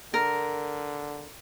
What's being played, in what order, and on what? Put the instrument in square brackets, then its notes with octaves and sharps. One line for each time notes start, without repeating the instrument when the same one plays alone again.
[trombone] D3 [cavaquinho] A#4